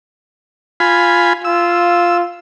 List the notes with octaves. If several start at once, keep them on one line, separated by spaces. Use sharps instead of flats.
F4 G#5 B5
F4 E6